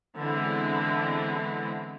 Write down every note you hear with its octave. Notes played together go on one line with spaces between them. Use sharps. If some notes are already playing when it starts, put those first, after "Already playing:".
D3 E3 G#3 B3 C4 E4